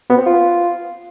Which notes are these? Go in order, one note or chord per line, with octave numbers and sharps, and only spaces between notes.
B3
C4
F4